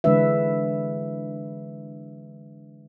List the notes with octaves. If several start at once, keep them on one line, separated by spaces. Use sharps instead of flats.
D3 E3 G#3 D4 B4 E5